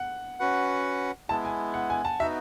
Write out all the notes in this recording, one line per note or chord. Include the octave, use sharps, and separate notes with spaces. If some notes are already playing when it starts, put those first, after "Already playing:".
Already playing: F#5
C#4 F#4 B4 F#5
G#3 B3 E4 A5
G#5
F#5
G#5
A5
B3 D#4 F#4 E5